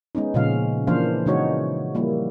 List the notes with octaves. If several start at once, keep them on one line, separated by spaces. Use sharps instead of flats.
G#3 B3 C#4 D#4
A#2 C#3 F3 G#3 C#4 F5
E3 F3 A#3 D4 C5 F5
C#3 E3 G#3 D#4 F#4 C#5
F3 G3 A#3 E4